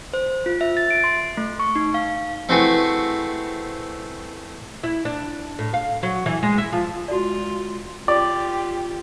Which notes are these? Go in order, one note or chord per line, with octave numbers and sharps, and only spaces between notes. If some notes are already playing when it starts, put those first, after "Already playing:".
C5
F4
E5
A6
D7
C6
A3
C#6
D#4
F5
A3 C4 E4 F#4 G#4 B4
E4
D4
A2
F5
F#3
E3
G#3
E4
F3
G#3 F4 F#4 D5
F4 G4 D5